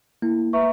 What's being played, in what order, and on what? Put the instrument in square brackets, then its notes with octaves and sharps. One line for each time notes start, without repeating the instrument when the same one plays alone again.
[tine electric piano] A#3 [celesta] E4
[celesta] B4 E5 A#5 C#6